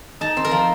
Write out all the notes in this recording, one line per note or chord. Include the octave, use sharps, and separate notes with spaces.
D#4 A5
C4
A#4
F3